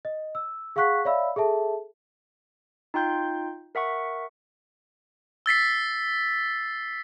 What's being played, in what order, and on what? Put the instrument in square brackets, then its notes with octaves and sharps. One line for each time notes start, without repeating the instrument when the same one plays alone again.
[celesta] D#5
E6
G#4 F5 F#5 C#6 F#6 B6
C#5 D5 E5 F5 B5 E6
G#4 A4 E5 A5
[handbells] D#4 F4 G5 C6 G6
A#4 E5 F#5 C#6
[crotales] E6 A6 B6 C7